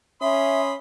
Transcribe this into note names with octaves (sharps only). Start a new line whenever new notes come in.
C#4 E5 B5 C6 D#6